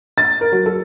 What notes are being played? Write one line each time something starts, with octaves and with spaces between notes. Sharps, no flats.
A6
A#4
F#3
A4